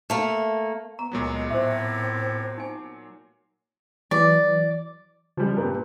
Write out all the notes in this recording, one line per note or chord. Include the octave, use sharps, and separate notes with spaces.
A3 A#3
B3 A#5
C#2 A#2 F#3 G#3 B3
A2 C4 C5 E5
D#4 G#5
E3 F#3 D5
C#3 F3 G3 G#3
G2 A#2 G4 A#4 B4